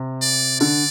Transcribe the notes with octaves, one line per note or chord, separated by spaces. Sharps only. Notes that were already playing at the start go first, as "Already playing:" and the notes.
Already playing: C3
D5
D3 D5